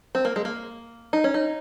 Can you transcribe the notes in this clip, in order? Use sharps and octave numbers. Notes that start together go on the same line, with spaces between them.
C4
A#3
G#3
A#3
D#4
C#4
D#4